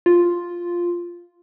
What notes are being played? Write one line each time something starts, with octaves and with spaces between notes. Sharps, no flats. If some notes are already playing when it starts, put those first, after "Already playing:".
F4